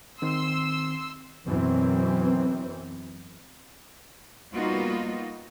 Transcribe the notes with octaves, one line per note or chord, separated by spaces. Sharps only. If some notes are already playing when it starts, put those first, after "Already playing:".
D#3 C4 C6 E6
F#2 B2 E3 C4
G3 A#3 B3 D#4 F4 F#4